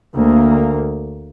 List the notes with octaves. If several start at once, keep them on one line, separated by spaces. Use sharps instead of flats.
D2 A#3